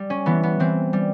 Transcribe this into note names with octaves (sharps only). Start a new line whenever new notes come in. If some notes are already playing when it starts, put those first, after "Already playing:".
Already playing: G3
C#4
E3 B3
B3
E3 C4
G3